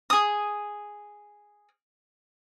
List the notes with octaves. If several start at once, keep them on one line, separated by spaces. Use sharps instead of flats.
G#4 D#6